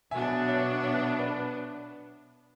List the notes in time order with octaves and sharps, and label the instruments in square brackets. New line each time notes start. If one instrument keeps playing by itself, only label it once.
[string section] B2 F#3 B3 D4 [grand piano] E5 G#5
[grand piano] C#5 E5
C#5 E5
B4 D5